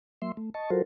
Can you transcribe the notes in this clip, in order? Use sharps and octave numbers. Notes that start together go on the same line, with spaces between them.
F#3 A#3 E5 C6
A3
D#5 A5 C#6
F#3 F4 F#4 A4 A#4 C5